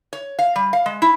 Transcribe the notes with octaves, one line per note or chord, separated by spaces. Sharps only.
C#5
F5
G3
F5
G#3
E4